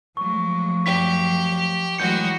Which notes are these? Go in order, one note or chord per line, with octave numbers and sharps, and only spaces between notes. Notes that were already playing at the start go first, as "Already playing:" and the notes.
F3 F#3 G#3 A3 C#6
F#2 F#3 G4 B6
E3 F#3 G#3 A3 F#4 D#5 G6 C#7